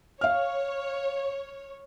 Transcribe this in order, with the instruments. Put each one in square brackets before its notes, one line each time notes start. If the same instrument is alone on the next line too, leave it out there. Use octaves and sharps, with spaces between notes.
[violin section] C#5 [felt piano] F5 F6